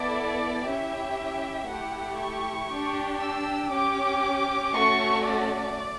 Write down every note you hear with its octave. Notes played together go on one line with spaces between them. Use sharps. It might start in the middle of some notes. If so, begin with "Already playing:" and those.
Already playing: B3 E4 A4 D5
C#4 E4 G4 E5
A3 E4 G4 F#5
C#6
D4 G4
E6
C#4 G4 D6
A3 C#4 F#4 A4 C#6
D5